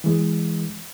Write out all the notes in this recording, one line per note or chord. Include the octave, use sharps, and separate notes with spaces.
E3 G#3